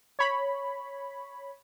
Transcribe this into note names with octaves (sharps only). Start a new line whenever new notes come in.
C#5 B5